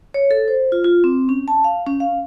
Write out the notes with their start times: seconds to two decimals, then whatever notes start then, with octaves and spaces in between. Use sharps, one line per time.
0.14 C#5
0.31 A4
0.48 C5
0.72 F4
0.84 F4
1.04 C4
1.29 C#4
1.48 A5
1.64 F5
1.87 C#4
2.00 F5